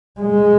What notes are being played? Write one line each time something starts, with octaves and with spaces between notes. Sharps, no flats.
G#3